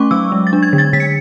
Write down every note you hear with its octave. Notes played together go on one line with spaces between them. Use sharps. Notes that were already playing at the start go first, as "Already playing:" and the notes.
Already playing: A3 C#4 C#6 D6
F#3 E6
G#3
A6
D4
G#6
D3
A6
D3 B6
C#7